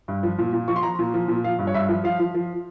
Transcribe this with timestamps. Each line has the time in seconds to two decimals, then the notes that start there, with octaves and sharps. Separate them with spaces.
0.08 G2
0.23 F3
0.38 A#2
0.53 A#2
0.68 F3 C#6
0.76 C6
0.83 F3 A#5
0.99 A#2
1.14 F3
1.28 A#2
1.44 F3 F5
1.59 G2
1.67 C#5
1.74 G2 E5
1.89 F3
2.04 F3 F5
2.20 F3
2.35 F3